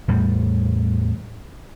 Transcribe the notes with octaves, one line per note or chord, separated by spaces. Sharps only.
E2 A2 G3